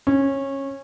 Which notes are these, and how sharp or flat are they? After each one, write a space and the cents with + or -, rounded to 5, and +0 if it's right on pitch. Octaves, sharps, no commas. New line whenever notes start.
C#4 -20